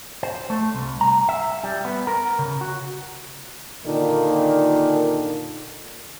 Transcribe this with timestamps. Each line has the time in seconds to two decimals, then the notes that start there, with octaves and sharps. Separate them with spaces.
0.23 C5
0.50 A3
0.74 C2
1.01 A#5
1.29 E5
1.64 G3
1.85 B3
2.07 A#4
2.39 C#3
2.61 F#4
3.85 A#2 D3 D#3 D4